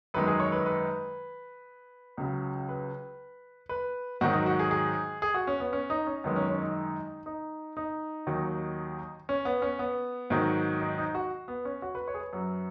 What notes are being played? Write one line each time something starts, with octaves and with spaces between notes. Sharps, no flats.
F#2 D#3 G#3 B4
G#4
C#5
B4
B4
C#2 C#3 F#3
B4
B4
G#2 D#3 F#3 F#4
D#4
F#4
G#4
G#4
G#4
F#4
C#4
B3
C#4
D#4
C#4
F#2 D#3 G#3 B3
C#4
C#4
D#4
D#4
D#4
D#2 D#3 F#3
C#4
B3
C#4
B3
G#2 D#3 F#3
D#4
D#4
F#4
B3
C#4
F#4
B4
C#5
G#4
B4
F#2 F#3